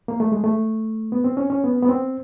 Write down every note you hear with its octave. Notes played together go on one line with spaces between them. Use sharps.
A#3
A3
G#3
A3
B3
C4
C#4
C#4
B3
B3
C4